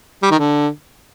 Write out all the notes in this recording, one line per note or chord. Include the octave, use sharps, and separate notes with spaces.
G3
D#3
D3